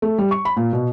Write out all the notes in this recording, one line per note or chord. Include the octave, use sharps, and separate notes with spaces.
A3
G3
C#6
B5
A#2
B2